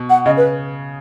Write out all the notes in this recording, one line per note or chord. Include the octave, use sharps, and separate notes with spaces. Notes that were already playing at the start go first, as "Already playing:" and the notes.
Already playing: B2
F#5
C#3 D#5
B4